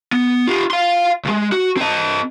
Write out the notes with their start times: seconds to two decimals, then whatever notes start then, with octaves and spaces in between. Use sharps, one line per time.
0.13 B3
0.47 F4 G4
0.71 F5 C6
1.25 C#2 G#3
1.52 F#4
1.77 C4 D#5